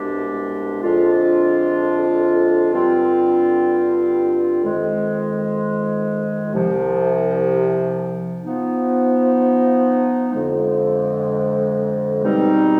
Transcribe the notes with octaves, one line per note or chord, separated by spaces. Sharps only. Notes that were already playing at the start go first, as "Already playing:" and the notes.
Already playing: C2 B2 G#3 D4 G4
F2 D3 G#3 D4 F4
G2 D3 G3 C4 F4
F2 D#3 G#3
C2 C3 F3
F3 B3 D#4
F2 D3 G#3
B2 G3 C4 D#4